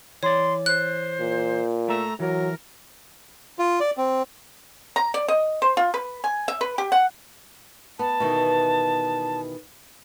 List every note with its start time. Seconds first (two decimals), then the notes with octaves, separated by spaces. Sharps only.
0.23 E3 C#5 D5 C6
0.66 C5 F#6
1.21 A#2
1.88 A3 E5 A#5
2.20 E3 F#3 A#4
3.59 F4
3.80 D5
3.97 C4
4.96 A#5
5.14 D5
5.28 D#5
5.62 C5
5.77 F4
5.94 B4
6.24 G#5
6.48 E5
6.61 B4
6.78 G4
6.92 F#5
7.99 B3 A5
8.20 B2 D#3 E3